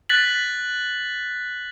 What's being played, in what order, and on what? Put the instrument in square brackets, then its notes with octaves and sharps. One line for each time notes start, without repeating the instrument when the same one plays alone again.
[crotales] F#6 A6 B6 F#7